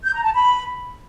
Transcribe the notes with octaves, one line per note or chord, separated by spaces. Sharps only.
G6
A#5
A5
B5